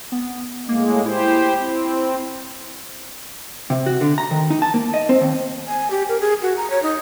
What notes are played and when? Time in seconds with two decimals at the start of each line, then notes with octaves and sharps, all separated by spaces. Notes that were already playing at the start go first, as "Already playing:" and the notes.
0.12 B3
0.68 A2 G#3 A#3
1.05 E4 G4 C5
1.58 C4
3.70 C3
3.86 F#4
4.01 D3
4.18 A#5
4.31 D#3
4.50 D#4
4.62 A5
4.74 A#3
4.94 D#5
5.09 C4
5.21 D#2
5.67 G#5
5.91 G4
6.09 A#4
6.21 G#4
6.42 F#4
6.57 A#5
6.70 C#5
6.83 D#4